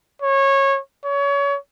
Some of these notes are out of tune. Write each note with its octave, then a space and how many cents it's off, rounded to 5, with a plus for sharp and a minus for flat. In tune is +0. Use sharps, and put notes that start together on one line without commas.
C#5 -20
C#5 +30